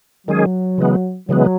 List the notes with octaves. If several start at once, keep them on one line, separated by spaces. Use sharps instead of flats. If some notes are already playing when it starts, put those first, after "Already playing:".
D#3 F#3 G#3 C#4 G#4
C#3 E3 G#3 B3
C#3 E3 F#3 G#3 B3